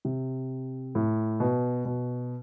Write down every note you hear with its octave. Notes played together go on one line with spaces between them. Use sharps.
C3
A2
B2
B2